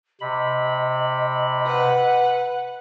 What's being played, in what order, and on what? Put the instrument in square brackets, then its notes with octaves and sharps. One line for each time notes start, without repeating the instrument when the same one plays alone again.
[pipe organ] C3 B5 [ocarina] D#5
[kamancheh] B4 F#5